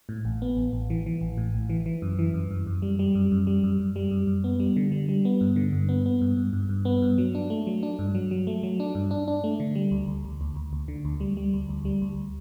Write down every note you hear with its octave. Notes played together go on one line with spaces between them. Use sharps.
A2
A1
B3
A1
A1
E3
E3
A1
A2
A1
E3
E3
F#2
E3
F#2
F#2
F#2
G3
G3
F#2
F#2
G3
F#2
F#2
G3
F#2
F#2
B3
G3
D3
G3
G3
B3
G2
D3
G2
B3
B3
G2
G2
G2
G2
B3
G2
F#3
D4
A3
F#3
D4
G2
F#3
F#3
A3
F#3
D4
G2
D4
D4
A3
D3
G3
D2
D2
D2
D2
D2
D2
D3
D2
G3
G3
D2
D2
G3
D2